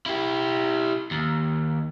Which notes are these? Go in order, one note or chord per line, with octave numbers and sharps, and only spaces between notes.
E4 G4
D#2